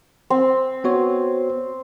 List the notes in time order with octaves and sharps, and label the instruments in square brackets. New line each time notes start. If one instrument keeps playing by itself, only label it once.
[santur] C4
[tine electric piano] B3 F#4 C#5